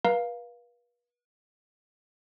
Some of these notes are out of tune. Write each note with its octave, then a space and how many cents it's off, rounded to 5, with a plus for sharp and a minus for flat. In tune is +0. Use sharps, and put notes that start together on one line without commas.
B4 -35 F5 +0 A#5 +0